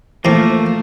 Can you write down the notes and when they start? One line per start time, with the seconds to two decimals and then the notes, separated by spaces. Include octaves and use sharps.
0.25 E3 F3 A3 A#3 C4